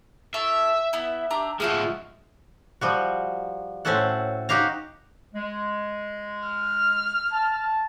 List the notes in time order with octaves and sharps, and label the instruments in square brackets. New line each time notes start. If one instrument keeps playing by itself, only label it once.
[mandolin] E4 A4 C#5 [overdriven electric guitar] E5
[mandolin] B3 E4
D4 G4 A#5
[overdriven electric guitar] F3 G#3 [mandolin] F#4 E5 F6
[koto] F3 G3 F#4
A2 C4 C#4 F#4 A4 F#5
D#4 F#4 G4 F5 A#5
[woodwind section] G#3
[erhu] F6
[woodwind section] A5